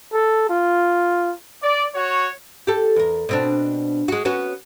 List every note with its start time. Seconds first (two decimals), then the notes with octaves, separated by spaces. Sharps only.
0.13 A4
0.49 F4
1.62 D5
1.95 F#4 C#5
2.67 G4 A4
2.96 E2 A#4
3.29 B2 C4 D4
4.08 G#3 F#4
4.25 B3 C#4 F#4